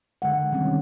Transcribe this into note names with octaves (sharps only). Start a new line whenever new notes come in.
D3 G#3 F#5
C3 D#3 G3 C4 C#4